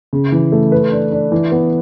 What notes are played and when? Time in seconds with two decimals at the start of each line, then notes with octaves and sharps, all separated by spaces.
0.13 C#3
0.32 E3
0.52 A3
0.72 B4
0.92 D4
1.12 D4
1.32 E3
1.52 B3